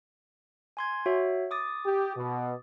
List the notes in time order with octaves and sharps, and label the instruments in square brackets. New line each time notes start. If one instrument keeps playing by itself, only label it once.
[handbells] G#5 C6 G#6
F#4 C#5 E5
D6 D#6 A6
[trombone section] G4
B2